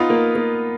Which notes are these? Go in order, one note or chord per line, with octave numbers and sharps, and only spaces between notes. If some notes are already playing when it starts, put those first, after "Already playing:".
Already playing: B3 D#4 F4
A#3
A#3